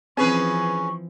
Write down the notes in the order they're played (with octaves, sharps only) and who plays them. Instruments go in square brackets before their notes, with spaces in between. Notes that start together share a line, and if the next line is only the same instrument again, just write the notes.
[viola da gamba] E3 F3 [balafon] C4 [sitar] C#4 G#4 B4 [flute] C#6